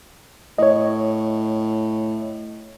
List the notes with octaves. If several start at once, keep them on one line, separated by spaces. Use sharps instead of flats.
A2 C#5 D#5